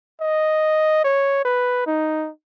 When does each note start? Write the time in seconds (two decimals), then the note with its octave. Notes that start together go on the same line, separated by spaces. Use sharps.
0.21 D#5
1.04 C#5
1.45 B4
1.86 D#4